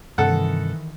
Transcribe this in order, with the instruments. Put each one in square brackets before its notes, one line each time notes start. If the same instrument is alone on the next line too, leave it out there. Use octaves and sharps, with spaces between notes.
[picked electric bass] G2 C3 [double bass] D#3 E3 [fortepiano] A4 F#5